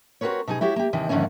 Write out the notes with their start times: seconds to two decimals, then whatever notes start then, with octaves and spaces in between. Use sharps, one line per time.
0.21 C4 F#4 G#4 A#4 B4 C#5
0.47 B2 D#4 G#4
0.61 E4 F#4 G4 C#5
0.76 A#3 G4
0.93 D#2 C3 D#3 E3
1.09 F2 G#2 D3 D#3 A#3 C#4